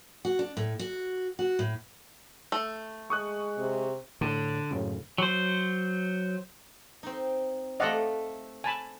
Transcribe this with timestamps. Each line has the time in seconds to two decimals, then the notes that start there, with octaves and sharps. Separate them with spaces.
0.25 F#4
0.39 D4
0.57 A2
0.79 F#4
1.39 F#4
1.59 A2
2.52 A3
3.10 G#3 C#6 D#6 F#6
3.58 C3
4.21 A2 D3
4.71 F#2 A2 C#3
5.18 F#3 C5
7.03 C4 D#4
7.80 A3 A4 D5 D#5 F5 F#5
8.64 G#5 A5 B5